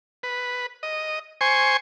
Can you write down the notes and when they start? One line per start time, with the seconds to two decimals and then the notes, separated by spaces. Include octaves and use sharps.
0.23 B4
0.83 D#5
1.41 C5 G#5 C#6